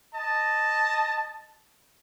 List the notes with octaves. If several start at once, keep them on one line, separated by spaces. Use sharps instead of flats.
D#5 A5